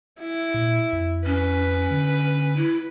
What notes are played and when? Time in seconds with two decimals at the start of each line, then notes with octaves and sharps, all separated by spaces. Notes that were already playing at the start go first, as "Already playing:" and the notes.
0.20 E4
0.54 A#2
0.93 F2
1.26 C#4 B4
1.91 D3
2.56 E4